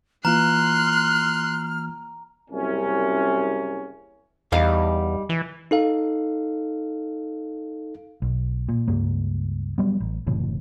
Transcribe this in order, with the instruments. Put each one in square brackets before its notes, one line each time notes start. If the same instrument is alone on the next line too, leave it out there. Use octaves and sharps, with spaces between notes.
[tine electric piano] E3 A#3 F4 [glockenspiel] A#5 [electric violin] C6 F#6 [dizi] F6
[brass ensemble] F#1 C2 F#2 C3 C#4
[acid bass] E2 [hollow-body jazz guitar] G3 D#4 F5
[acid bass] E3
[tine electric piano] D#4 A4 F5
[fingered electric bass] B1
A#2
C#2 G2 A#3
F#3 G3 B3
A1
F#1 A2 C3 E3